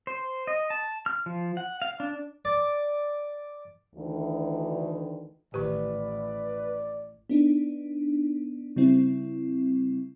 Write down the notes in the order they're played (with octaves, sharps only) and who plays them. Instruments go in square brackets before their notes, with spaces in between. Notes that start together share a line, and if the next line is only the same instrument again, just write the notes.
[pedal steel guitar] C5
D#5
A5
F6
F3
F#5
F5
D4
[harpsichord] D5
[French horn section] D2 D#3 E3
[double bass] A1 [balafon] D#3 G4 [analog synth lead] B4 [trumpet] D5
[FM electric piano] B3 D4 D#4
C#3 G3 C4 E4